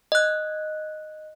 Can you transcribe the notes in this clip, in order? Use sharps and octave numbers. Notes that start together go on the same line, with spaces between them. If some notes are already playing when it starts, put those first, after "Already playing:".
D#5 F#6